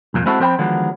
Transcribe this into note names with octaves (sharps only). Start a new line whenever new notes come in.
C2 F2 A#2
G#3 C4 E4 F#4 A4
F3 C4 C5 D#5 G5 B5
D3 D#3 F3 F#3 G#3 B3